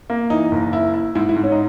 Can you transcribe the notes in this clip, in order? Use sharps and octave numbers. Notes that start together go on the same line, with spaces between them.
A#3
E3 D#4
F#1
E4
E4
G#2 E4
E4
G#2
C#4
D#4